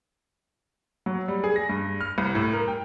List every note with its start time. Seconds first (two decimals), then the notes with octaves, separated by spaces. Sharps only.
1.06 F#3
1.28 G3
1.44 G#4
1.56 A#6
1.69 G2
2.01 F6
2.18 C2
2.35 A2
2.53 A#4
2.68 G5